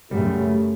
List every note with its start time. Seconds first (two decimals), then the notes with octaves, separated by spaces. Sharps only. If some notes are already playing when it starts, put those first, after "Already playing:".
0.11 F#2 C#3 F#3 G3 A3